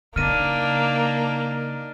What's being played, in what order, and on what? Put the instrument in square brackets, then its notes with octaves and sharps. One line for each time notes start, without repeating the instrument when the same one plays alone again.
[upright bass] C#3 [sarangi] A#3 [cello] D4 D#4 [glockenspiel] F6 D#7